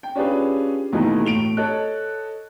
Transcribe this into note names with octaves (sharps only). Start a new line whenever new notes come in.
G5
C#4 D4 F4 G4 G#4 B4
D#2 B2 E3 G#3 A3 D#4
A2 D7 F7 G7
A4 C#5 D#5 F#6